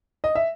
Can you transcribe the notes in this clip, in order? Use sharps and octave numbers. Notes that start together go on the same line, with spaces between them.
D#5
E5